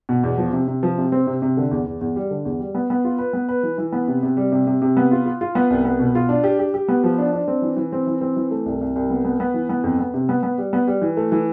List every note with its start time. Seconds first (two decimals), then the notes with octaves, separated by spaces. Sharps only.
0.09 B2
0.24 E2
0.38 F3
0.53 C3
0.68 C3
0.83 F3
0.98 C3
1.12 C4
1.27 C3
1.42 C3
1.57 D3
1.71 E2
1.86 E2
2.01 E2
2.16 G3
2.31 D3
2.45 E2
2.60 G3
2.75 B3
2.90 B3
3.04 F4
3.18 B4
3.33 B3
3.48 B4
3.63 E3
3.78 E3
3.92 B3
4.08 C3
4.23 C3
4.37 G3
4.52 C3
4.67 C3
4.82 C3
4.97 B3
5.11 F4
5.26 F4
5.41 F4
5.55 B3
5.70 C2
5.85 B3
6.00 B2
6.15 F4
6.29 D4
6.44 G4
6.59 G4
6.74 G4
6.88 B3
7.04 F3
7.18 D4
7.33 D4
7.48 C4
7.62 E3
7.77 E3
7.92 C4
8.07 E3
8.21 C4
8.36 E3
8.51 A3
8.66 C2
8.81 C2
8.96 C2
9.10 B3
9.25 B3
9.40 B3
9.54 E3
9.69 B3
9.84 F2
9.99 B3
10.14 C3
10.29 B3
10.43 B3
10.58 G3
10.73 B3
10.87 G3
11.02 E3
11.17 A3
11.32 E3